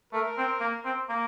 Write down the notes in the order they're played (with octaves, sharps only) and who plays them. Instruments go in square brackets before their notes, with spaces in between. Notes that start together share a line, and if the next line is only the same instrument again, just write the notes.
[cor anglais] A3 [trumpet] A#4
[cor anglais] C4
A#3
C4
A#3